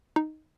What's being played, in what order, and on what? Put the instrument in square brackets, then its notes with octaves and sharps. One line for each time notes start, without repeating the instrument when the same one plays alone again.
[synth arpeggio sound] D#4